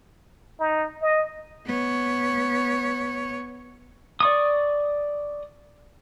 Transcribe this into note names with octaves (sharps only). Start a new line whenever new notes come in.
D#4
D#5
B3 C#5
D5 C#6 D#6